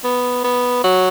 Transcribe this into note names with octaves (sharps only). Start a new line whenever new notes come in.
B3
B3
F#3